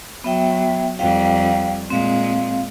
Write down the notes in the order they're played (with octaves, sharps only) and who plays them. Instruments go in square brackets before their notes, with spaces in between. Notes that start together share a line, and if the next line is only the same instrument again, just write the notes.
[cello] F#3 [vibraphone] B3 E5 G5
[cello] F2 G3 [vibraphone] F5 G5
[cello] A#2 G#3 [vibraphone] C4 F5